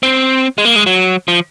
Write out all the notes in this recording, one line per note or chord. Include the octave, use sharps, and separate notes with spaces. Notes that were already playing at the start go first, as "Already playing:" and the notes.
C4
G#3
A#3
G#3
F#3
F3